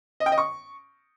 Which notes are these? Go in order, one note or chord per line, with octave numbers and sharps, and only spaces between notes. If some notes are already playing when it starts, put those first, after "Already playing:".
D#5
G5
D#5
C#6